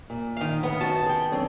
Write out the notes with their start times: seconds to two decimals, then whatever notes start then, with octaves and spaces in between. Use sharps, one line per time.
0.10 A#2
0.36 D#3 F5
0.63 A2 C#3 B3
0.80 F#2 F#4 A5
1.06 G#4 G5
1.32 D3 F#3 C4